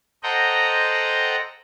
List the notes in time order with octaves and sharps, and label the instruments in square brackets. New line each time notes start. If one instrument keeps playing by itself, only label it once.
[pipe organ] A4 C5 D#5 F#5 G5 A#5